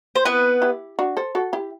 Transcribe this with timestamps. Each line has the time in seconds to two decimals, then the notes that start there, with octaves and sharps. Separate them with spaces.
0.16 C5
0.25 B3 C4 E4 B4
0.62 E4 G4
0.99 D4 F#4
1.17 A4 C5
1.35 F#4 A4
1.53 E4 G4